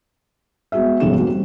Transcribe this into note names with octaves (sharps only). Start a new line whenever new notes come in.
G#3 B3 F#4 G#4 E5
F1 B1 G#2 G3 C#4 E7
A#3 C4 F#4
G3